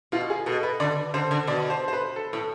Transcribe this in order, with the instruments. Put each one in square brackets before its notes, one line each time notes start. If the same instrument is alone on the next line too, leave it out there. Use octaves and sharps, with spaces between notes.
[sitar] B2 [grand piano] F4
[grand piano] G#4
[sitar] B2 [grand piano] A4
[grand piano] B4
[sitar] D3 [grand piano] D5
[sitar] D3 [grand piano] C5
[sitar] D3
[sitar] B2 [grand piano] D5
[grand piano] C5
C5
B4
A4
[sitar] A2